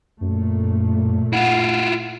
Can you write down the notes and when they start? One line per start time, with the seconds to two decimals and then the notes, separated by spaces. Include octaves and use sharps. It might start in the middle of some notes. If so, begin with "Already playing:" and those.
0.21 F#2 A#2 A3
1.33 E4 F4 F#5